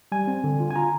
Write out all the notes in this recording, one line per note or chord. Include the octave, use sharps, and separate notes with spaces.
G3 G#5
C4
D3
F4
G#5
F4 A#5